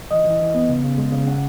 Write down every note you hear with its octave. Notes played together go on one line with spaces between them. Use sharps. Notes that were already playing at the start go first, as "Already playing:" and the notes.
E3 D#5
E3
E3
B3
C#3
C#3
G#3
C#3
C#4 F#5